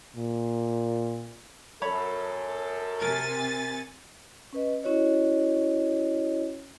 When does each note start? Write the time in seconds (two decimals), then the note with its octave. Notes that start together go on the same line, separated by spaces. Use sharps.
0.16 A#2
1.82 F#2 A4 C#5 B5
3.01 C3 A#4 G#5 A6
4.53 C#4 B4 D#5
4.83 C#4 E4 F#4 C#5 D#5